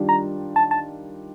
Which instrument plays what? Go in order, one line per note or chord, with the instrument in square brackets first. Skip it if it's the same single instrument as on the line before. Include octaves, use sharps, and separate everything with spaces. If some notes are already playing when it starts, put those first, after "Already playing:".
Already playing: [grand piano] D#3 G3 D4 F4
[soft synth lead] A#5
A5
A5